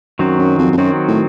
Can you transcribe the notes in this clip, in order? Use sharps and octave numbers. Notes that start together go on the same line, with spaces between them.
F#2 D#3 F#3 C4 F#4
F#2
F2
F2
F#2 D#3 F#3 C4 F#4
A2